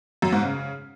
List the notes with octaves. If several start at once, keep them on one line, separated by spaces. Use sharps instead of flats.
F#2
G#2
C#3